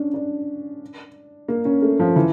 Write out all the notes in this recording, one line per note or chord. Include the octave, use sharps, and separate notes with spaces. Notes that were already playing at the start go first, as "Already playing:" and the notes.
Already playing: C#4 D4
D4
A#3
C#4
A3
F3
E3